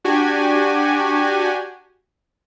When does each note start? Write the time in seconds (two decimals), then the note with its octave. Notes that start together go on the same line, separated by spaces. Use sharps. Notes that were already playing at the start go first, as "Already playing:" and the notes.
0.04 D4 F#4 G4 G#5